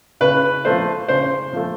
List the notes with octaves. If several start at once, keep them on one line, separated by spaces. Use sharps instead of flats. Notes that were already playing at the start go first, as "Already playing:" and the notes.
C#3 B4
F3 A3 C5
C#3 C5
F3 A3